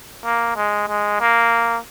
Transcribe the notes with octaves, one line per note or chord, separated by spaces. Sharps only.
A#3
G#3
G#3
A#3